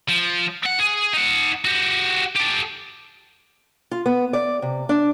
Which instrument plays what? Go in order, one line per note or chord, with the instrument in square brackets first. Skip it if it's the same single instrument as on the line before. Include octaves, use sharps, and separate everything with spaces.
[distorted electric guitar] F3
F#5
G#4
D#4 F#5
F#4 G4
G4 A4
[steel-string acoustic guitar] F4
B3
D5
C3
D4